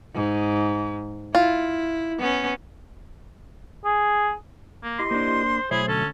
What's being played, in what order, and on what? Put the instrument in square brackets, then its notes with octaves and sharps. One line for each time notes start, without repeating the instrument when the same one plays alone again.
[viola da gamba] G#2
[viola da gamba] E4 [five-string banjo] F4
[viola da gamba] B3 C#4
[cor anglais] G#4
A#3
[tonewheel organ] E4 G4 D#5 [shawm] C6
[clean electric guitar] A#3 D4 [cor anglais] C5
[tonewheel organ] B2 F#3 A3 [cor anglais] E4 [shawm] G#4 [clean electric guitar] C5
[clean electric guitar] D2 [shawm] C#4 [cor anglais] A4